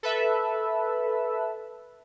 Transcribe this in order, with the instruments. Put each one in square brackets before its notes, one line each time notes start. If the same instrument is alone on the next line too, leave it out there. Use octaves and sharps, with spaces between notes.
[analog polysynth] A4 B4 E5